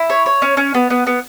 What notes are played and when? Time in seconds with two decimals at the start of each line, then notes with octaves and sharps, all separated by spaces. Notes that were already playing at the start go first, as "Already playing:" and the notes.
Already playing: E4
0.10 C#5
0.26 C#5
0.42 C#4
0.57 C#4
0.74 B3
0.90 B3
1.07 B3